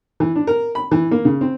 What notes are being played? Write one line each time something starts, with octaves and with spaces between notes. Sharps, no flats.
E3
D4
A#4
B5
E3
A#3
C#3
C4